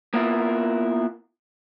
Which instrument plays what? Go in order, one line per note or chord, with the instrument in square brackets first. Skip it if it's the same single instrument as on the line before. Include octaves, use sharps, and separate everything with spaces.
[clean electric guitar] A#3 B3 E4 F4 A#4